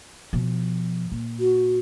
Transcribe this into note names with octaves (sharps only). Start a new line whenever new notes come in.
B2 F3
A#2
F#4